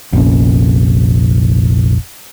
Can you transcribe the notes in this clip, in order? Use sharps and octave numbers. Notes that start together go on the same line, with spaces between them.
F1 A#1 C#4